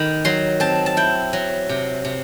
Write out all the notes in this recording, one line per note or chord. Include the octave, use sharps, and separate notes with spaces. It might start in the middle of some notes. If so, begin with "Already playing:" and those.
Already playing: D#3 D#4 B5
F#3 C6
C4 A5
A5
E4 G5
F#3
C3
C3